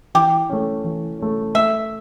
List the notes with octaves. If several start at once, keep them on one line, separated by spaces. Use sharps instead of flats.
E3 G4
A3 C#4
E3
A3 C#4
A3 E5